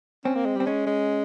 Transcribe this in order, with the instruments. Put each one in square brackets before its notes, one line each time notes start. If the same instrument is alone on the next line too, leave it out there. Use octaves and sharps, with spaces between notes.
[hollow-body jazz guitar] C4 [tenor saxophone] C#4
[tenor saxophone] A#3
G#3
[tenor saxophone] G3 [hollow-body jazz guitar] C4
[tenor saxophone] G#3 [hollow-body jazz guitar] C#4
[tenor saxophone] G#3